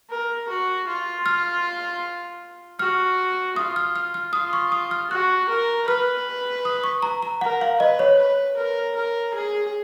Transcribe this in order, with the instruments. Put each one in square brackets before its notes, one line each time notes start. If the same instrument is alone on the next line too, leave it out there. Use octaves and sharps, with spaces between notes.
[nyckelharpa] A#4
F#4
F4
[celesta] F6
[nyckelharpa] F#4 [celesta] F6
[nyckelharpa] F4 [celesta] D#6
[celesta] F6
F6
F6
[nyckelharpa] F4 [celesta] D#6
[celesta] C#6
D#6
F6
[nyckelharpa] F#4 [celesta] F#6
[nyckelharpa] A#4
[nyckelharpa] B4 [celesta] F6
[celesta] D#6
C#6
A#5
A#5
[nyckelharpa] A#4 [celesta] F#5
[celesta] F5
[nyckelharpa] B4 [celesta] D#5
[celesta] C#5
[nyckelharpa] B4
A#4
A#4
G#4